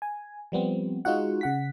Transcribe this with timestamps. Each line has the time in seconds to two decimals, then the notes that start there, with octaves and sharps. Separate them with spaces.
0.02 G#5
0.52 F3 G3 B3 C4
1.05 G#3 D#4 F4 F#4 F#5
1.41 C#3 F#5 B6